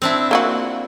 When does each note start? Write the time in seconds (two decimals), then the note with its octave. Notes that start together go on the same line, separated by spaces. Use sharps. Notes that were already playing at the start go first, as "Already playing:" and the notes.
0.02 C4 D4 E4
0.31 A#3 F4 F#4